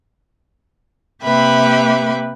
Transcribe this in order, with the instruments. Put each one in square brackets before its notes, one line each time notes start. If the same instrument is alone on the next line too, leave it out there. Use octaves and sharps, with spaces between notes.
[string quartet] C3 A#3 G4 B4 E5 B5